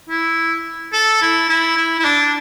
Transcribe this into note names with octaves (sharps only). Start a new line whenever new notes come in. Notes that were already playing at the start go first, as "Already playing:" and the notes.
E4
A4
E4
E4
E4
E4
D4